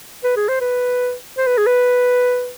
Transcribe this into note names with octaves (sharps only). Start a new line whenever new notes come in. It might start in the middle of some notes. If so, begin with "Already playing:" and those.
B4
G#4
C5
B4
C5
B4
G#4
B4